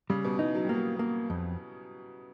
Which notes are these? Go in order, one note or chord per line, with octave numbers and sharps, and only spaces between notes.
C#3 G3
B2
E3 D#4
F#3
G3
F#3 A#3
A#3
F2